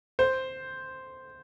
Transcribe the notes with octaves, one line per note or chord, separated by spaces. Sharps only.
C5